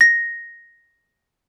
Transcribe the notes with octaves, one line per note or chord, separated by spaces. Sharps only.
A#6